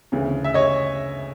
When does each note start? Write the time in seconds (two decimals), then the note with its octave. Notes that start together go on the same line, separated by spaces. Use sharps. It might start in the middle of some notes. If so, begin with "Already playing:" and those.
0.12 D2 C#3 E3
0.44 E5
0.54 C#5 D#5